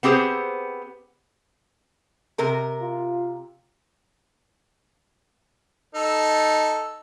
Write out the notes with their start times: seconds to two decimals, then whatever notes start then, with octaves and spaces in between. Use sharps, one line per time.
0.03 B3 C4 G4 G#4 C5
2.38 C3 A#4 A#5
2.82 F4
5.95 D#4 A4